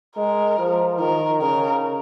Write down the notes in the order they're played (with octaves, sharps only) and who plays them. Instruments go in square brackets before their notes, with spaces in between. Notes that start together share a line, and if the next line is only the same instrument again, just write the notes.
[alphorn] G#3 [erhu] A#4
[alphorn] F3
[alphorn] D#3 [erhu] A#4
[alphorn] C#3 [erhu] A#4